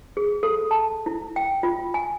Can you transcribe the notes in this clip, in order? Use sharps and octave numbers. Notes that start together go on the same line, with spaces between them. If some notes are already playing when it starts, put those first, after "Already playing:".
G#4
A4
A5
E4
G5
F4
G#5